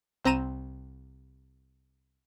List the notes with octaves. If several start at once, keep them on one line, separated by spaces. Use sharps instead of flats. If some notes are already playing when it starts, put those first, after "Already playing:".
C2 C4 A#5 D#7 E7